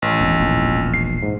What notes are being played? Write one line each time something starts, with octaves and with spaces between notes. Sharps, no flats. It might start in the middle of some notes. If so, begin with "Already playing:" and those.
A1
E1
E1 A#1
C7
G#2